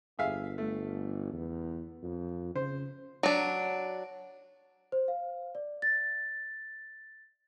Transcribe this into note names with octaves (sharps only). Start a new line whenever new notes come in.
G1 G#4 E5 F5
A3
E2
F2
C#3 C5
F#3 D4
C5
F5
D5
A6